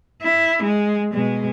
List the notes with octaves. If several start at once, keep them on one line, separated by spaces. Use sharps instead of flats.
E4
G#3
B2 G#3